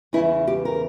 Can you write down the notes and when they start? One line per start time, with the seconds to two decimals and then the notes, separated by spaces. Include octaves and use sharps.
0.13 E2 C#3 E3 E4
0.47 G4
0.65 A#4